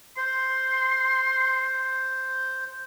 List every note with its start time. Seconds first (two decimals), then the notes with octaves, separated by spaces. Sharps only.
0.17 C5 C6